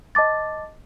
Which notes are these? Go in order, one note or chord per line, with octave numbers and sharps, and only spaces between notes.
D#5 A5 D6 A6